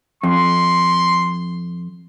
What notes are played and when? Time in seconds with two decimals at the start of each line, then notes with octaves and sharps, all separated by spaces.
0.23 F2 C6